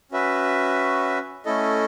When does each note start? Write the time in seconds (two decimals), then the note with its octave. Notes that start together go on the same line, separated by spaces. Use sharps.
0.12 C#4 F#4 B4 E5
1.45 A3 C#4 E4 A4 D#5